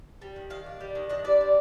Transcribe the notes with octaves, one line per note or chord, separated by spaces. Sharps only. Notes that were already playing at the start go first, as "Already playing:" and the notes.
G3
D#3
D#3 F5
D4
G3
D#3
D4 D#5
G3 D5
C4